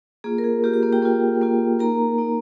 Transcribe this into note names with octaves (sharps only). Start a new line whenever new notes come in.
A#3 F4 G#4
A#4
G#4
A#3 F4 G4
G4
A#3 A#4
G4 G5
A#3 F4
A#3 F4
A#3 D#4 A#4 A#5
A#3 D#4